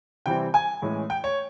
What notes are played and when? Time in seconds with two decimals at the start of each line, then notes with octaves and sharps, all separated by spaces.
0.26 C3 E3 G3 C4 G5
0.54 G#5
0.82 A2 E3 G#3 C#4
1.10 G5
1.24 C#5